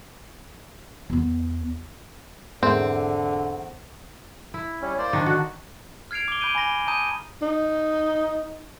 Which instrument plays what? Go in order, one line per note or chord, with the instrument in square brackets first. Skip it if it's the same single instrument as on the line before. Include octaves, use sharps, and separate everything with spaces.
[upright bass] E2 B3
[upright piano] E2 E5 [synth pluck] G#2 G#4 A#4 [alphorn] D3 [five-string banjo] C4
[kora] E4
[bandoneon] G3 C#4
A#3 C5 D5
[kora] D#3 D4
[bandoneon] D3 [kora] F#4
[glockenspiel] F6 G#6 C7 D7 F7
D6 G7
B5 G6 D7 D#7 G7
G#5 B5 A#6 G7
A5 A#5 D#6 G6 D#7
[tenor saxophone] D#4